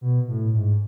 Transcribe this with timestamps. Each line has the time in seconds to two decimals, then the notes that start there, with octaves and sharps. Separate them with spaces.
0.01 B2
0.28 A2
0.54 G#2